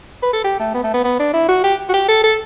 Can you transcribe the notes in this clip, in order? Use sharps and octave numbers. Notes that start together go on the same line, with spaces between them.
B4
A4
G4
A3
B3
A3
B3
B3
D4
E4
F#4
G4
F#4
G4
A4
A4